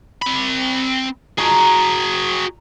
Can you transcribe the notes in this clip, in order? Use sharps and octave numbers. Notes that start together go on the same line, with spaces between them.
C4 B5
F#4 G#4 A#5